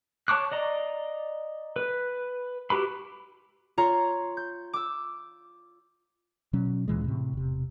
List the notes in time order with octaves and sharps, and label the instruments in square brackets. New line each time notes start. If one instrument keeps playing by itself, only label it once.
[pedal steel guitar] C#5 A5 C#6 D6 F#6
D5 D#5 A#5
B4
E4 F#4 G4 B4 B5
[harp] F4 C#5 A#5 C6
G6
D6 E6
[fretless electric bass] B2 F#3 C#4
D2 A#2 E3 G#3
A2 C3
E1 C3